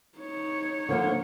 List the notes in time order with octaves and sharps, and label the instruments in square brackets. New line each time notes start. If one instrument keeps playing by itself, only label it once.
[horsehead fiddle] D#4 C#5
[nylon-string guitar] D3 F3 A#3